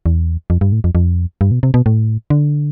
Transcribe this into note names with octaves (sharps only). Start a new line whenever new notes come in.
E2
F2
G2
A2
F2
F2
G2
B2
C3
B2
A2
D3